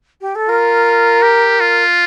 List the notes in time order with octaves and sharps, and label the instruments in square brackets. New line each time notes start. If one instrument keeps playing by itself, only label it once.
[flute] G4
A4
[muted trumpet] F4 [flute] A#4
[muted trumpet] G4
F4